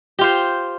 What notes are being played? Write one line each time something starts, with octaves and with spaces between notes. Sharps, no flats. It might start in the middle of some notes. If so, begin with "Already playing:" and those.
F4 G4 C5